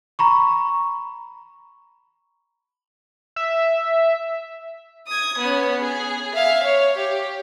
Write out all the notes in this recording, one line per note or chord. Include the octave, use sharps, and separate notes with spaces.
A#5 B5 C#6
E5
D#6 G#6
B3 C#4
G#4
E5 F5
C#5
G4